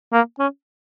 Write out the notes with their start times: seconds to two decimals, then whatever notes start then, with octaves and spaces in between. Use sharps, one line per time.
0.13 A#3
0.39 C#4